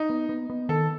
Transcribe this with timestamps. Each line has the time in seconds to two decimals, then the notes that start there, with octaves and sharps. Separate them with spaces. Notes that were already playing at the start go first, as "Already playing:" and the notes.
Already playing: D#4
0.10 B3
0.29 B3
0.50 B3
0.69 D#3 A4